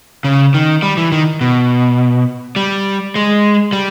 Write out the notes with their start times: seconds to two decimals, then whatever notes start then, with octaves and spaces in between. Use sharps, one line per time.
0.24 C#3
0.54 D#3
0.82 G3
0.97 E3
1.12 D#3
1.41 B2
2.56 G3
3.15 G#3
3.73 G3